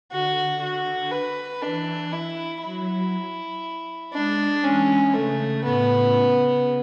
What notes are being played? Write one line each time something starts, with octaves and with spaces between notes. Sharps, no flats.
D3 F#4
F#4
B4
E3 D4
E4
F#3 E4
G#3 D4
E3 C#4
C#3 A3
A2 B3
C#3